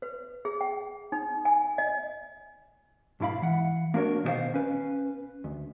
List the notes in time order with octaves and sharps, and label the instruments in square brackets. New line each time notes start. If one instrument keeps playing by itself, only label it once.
[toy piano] B4
G#4
G5
D#4
G#5
D#5
[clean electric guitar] B1 G#2 E4 F5 B5
E3 F#5
A#3 D4 F#4 A#4 C#5
B2 D#3 D#4 G4 C5 F5
C#4 B4
D2